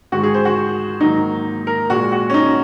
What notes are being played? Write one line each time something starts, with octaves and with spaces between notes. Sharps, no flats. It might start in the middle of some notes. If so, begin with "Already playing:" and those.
G#2 D#3 G#3 F#4
G#4
C5
F#4
G#2 D#3 F#3 A#3 D#4
A#4
A#2 G#3 F#4
F#4
C#4
D#4